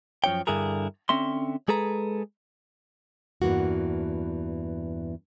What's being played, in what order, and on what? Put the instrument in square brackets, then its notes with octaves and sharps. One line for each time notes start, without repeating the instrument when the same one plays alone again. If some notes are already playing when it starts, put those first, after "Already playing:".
[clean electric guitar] F#2 F3 D#4 C#5 G5
G2 D3 E4 G#4 A#4
D3 C4 C#4 E5 C6
G#3 G#4 A4 B4 A#5
[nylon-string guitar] E2 G2 E3 A#3 F#4